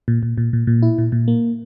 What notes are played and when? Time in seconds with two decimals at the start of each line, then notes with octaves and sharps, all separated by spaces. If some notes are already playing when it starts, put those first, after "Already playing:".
0.08 A#2
0.23 A#2
0.38 A#2
0.53 A#2
0.67 A#2
0.83 E4
0.98 A#2
1.12 A#2
1.28 A#3